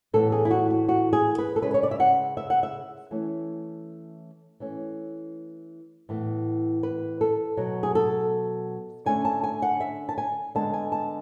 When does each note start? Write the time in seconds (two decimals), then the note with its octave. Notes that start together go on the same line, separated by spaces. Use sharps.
0.13 A2 E3 B3 A4
0.32 G#4
0.45 E4
0.51 F#4
0.70 F#4
0.88 F#4
1.13 G#4
1.39 B4
1.56 A4
1.62 C#3 G#3 C#4 B4
1.74 C#5
1.83 D5
1.91 E5
2.00 F#5
2.37 E5
2.50 F#5
2.63 E5
3.11 E3 A3 C#4
4.60 E3 A3 C#4
6.09 A2 E3 B3
6.83 B4
7.21 A4
7.57 B2 F#3 B3
7.83 G#4
7.95 A4
9.06 D3 A3 C#4 G#5
9.25 A5
9.43 G#5
9.62 F#5
9.80 E5
10.09 A5
10.18 G#5
10.55 D3 G#3 B3 A5
10.74 G#5
10.92 A5